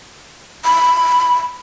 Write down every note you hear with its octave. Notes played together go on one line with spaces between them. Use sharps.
B5